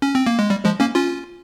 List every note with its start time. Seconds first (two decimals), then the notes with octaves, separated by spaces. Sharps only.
0.02 C#4
0.15 C4
0.27 A#3
0.39 G#3
0.50 G3
0.65 F3 G#3
0.80 A#3 C#4
0.95 C#4 F4